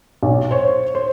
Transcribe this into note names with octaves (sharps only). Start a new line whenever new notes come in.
B1
C5 C#5
C5